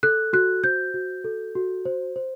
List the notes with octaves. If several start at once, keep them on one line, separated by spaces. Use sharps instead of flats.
A4 F#6
F#4 F#6
C5 G6
F#4
A4
F#4
C5
C5